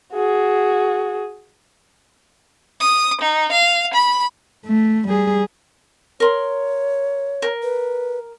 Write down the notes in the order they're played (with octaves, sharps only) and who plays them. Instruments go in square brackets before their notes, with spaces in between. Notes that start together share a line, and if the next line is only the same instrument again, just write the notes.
[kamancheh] F#4 G#4
[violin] D#6
D#4
F5
B5
[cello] A3
G3 G#4
[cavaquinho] A#4 C6 [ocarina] C#5
[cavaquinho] A#4
[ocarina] B4